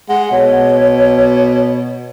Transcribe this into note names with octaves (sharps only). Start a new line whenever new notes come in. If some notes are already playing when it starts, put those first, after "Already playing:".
G#3 F#5
B2 C#5